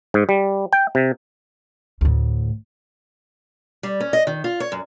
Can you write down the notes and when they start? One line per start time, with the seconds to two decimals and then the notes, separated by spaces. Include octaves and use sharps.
0.14 G#2
0.29 G3
0.73 G5
0.95 C3
2.01 D2 A2
3.83 G3
4.00 C#4
4.13 D#5
4.27 D#3
4.44 F4
4.60 C#5
4.72 F#2